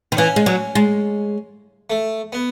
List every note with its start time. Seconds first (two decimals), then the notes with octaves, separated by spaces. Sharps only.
0.12 D#3
0.17 E3 C#4
0.36 G#3
0.46 F#3
0.75 G#3
1.90 A3
2.33 B3